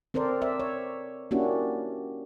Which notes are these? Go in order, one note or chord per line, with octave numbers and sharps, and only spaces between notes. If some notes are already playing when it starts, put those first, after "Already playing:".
C4 A4 A#4 C5 D5
C5 D5 E5
C#5
A#3 C#4 D4 E4 F#4 G4